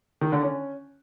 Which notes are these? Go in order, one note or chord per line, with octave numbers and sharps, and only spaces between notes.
D#3
D3
C#4